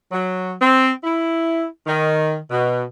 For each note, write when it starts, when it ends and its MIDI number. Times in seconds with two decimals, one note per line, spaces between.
0.12 0.53 54
0.60 0.90 60
1.04 1.65 64
1.86 2.37 51
2.51 2.84 47